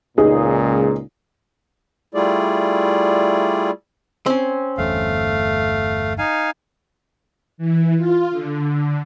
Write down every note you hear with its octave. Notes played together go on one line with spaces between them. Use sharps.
C#2 A#2 D#4 G#4
G3 A3 E4 F4 G#4 D5
C4 C#4
G1 E2 G2 A3 F5
D#4 F5 G#5
E3
F4
D3